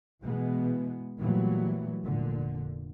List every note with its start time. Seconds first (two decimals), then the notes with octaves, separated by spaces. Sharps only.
0.22 B2 E3 G#3 B3
1.19 A#2 E3 F#3 G3 A3 B3
2.05 F1 A#2 D3